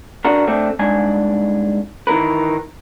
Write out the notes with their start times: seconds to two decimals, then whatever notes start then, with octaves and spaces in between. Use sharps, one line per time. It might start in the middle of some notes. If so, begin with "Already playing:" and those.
0.25 D4 F#4 A#4
0.47 A3 C4 D4
0.79 C2 G#2 D4 G#5
2.07 D#3 E3 C4 A#4 B4